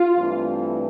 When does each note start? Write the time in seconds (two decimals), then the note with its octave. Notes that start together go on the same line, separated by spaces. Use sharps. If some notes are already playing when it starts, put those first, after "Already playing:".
Already playing: F4
0.17 G2 E3 A3 C4